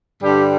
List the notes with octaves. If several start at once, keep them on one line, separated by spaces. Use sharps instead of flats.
G2 D3 G3 G4